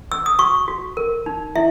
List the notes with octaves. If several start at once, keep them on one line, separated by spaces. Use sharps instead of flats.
E6
D#6
F#4 C#6
F#4
A#4
D#4
E4 E5